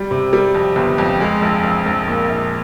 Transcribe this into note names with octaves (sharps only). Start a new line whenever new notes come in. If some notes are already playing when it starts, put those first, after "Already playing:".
Already playing: G3
C3
G3
F2
G1
F2
G#3
A#1
A#1
A#1
A#2
A#1